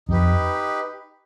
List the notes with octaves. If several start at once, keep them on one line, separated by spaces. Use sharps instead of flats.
F2 D#4 G4 B4